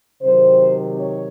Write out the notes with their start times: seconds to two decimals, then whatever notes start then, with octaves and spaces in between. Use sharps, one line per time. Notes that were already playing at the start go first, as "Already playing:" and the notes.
0.21 C3 D#3 F#3 C5
1.00 C#5